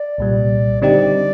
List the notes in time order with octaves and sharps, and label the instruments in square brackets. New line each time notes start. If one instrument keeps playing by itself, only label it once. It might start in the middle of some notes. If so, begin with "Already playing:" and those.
Already playing: [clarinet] D5
[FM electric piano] C2 A#2 G3
[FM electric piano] D3 G3 C4 D#4 G4 [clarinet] D5